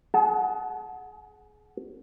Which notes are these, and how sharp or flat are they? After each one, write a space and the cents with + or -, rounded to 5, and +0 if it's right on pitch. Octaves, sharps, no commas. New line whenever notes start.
G#4 +25 F#5 +0 A5 -30